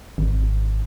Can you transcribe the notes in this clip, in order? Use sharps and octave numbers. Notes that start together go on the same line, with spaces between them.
G#1